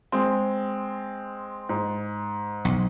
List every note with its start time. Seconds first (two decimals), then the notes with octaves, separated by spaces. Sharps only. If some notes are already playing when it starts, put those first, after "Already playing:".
0.12 G#3 C4
1.69 G#2
2.65 B1